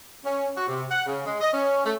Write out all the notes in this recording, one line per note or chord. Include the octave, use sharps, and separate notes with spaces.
C#4
F#4
C3
F#5
C#3
G#3
D#5
C#4
A3